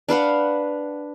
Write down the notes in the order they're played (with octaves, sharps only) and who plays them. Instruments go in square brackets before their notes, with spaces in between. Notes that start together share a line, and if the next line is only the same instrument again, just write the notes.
[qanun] D4 B4 F5 F#5